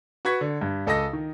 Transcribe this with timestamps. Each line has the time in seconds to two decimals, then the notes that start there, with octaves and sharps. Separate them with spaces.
0.25 F#4 B4 C#6 G#6 B6
0.41 D3
0.61 G2
0.87 C#2 A4 D#5 D#6 A#6
1.13 D#3